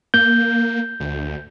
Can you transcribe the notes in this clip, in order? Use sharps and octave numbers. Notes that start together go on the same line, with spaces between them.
A#3 G6
D2